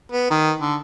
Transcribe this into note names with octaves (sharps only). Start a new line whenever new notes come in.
B3
D#3
D3